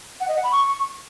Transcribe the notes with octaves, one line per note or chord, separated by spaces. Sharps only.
F#5
D#5
F#5
B5
C#6